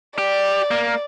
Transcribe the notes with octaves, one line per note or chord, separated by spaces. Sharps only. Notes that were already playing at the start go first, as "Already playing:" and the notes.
G4 D5
A#3